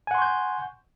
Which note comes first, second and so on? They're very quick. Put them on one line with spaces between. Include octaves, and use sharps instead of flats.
G#5 F#5 C6 C#6 G6